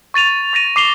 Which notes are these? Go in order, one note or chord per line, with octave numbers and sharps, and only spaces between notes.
C#6 A6 D#7 F7
C#6 A6 A#6 D#7
D6 C7 F7 G7